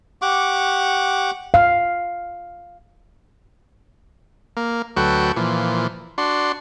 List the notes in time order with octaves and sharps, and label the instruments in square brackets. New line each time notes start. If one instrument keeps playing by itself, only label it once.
[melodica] G4 F#5 C#6 D6
[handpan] F5
[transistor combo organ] A#3
D2 F#3 F#4 A4 B4 G5
A#2 E3 F3
D4 F#4 C6